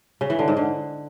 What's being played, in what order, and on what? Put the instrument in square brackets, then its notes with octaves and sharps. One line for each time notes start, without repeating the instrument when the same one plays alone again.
[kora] C#3
E3
D3
G#2
D3